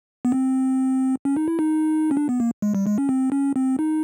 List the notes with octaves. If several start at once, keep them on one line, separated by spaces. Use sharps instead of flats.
B3
C4
C#4
D#4
E4
D#4
C#4
D4
B3
A#3
G#3
G3
G#3
C#4
C4
C#4
C4
D#4